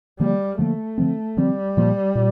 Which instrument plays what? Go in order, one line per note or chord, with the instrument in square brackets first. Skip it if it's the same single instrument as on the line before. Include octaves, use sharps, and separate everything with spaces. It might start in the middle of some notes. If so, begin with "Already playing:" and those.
[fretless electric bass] D3 F3 A#3 [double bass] G3
[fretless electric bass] D3 F3 A#3 [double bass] A3
[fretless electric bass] D3 F3 C4
[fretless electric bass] D3 F3 C4 [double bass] G3
[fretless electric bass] A#2 F3 A#3
A#2